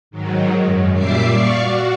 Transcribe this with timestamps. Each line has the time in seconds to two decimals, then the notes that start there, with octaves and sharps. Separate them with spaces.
0.11 G#2 D#3 F#3
0.59 F#2
0.94 A#2 G3 E5 D6 C7
1.26 D5 F5 C#6
1.59 F#4